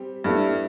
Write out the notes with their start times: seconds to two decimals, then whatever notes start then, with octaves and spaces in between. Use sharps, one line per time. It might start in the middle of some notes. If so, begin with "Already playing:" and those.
Already playing: G3 C4 G4
0.24 G2 G3 B3 E4 A4